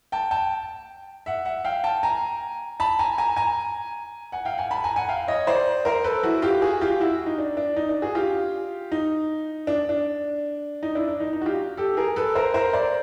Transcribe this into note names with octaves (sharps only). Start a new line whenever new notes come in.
G5 A5
G5 A5
E5 F#5
E5 F#5
F5 G5
G5 A5
G#5 A#5
A5 B5
G#5 A#5
G#5 A#5
G#5 A#5
F#5 G#5
F5 G5
F#5 G#5
A5 B5
G#5 A#5
F#5 G#5
F5 G5
C#5 D#5
C5 D5
A#4 C5
A4 B4
E4 F#4
F4 G4
F#4 G#4
F4 G4
E4 F#4
D#4
D4
D4
D#4
D4
F#4 G#4
F4 G4
D#4
D4
D4
D#4
D4 E4
D4
D#4
D#4
F#4
F4 G4
G4 A4
G#4 A#4
A4 B4
A#4 C5
A#4 C5
C5 D5